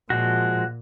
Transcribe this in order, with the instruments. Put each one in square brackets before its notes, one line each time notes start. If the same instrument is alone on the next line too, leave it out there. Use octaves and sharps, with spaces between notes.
[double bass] A#2 [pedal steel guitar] F3 G#3 F#4